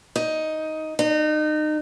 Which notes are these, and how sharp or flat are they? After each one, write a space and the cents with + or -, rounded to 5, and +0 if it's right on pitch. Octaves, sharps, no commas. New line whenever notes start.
D#4 +10
D#4 -30